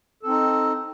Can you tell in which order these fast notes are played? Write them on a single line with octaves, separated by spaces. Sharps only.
A4 C4 D#4